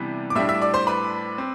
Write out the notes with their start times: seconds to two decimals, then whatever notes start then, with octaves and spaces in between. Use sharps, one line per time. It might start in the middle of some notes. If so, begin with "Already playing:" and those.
Already playing: C3 E3 G3 B3 D4
0.30 D6
0.35 A2 G3 D4 E5 E6
0.49 E5 E6
0.61 D5 D6
0.74 C5 C6
0.87 B4 B5
1.38 C4